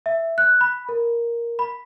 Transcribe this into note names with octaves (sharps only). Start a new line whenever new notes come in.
E5
F#6
B5
A#4
B5